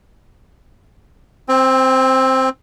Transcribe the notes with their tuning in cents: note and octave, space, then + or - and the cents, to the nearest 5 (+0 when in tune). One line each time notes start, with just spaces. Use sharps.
C4 +0 G5 +35